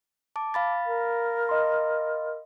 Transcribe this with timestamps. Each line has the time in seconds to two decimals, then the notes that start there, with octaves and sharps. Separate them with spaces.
0.36 A5 D6
0.54 F5 B5 A6
0.86 A#4
1.49 D#5 C6